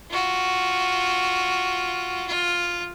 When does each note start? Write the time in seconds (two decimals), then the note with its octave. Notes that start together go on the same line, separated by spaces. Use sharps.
0.11 F4 F#4
2.28 F4